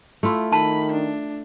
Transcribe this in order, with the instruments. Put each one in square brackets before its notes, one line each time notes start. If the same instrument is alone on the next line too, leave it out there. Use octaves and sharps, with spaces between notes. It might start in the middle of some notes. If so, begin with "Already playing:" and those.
[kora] A3 E4 F4
[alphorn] D#3 [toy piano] A5 [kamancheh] B5
[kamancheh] D4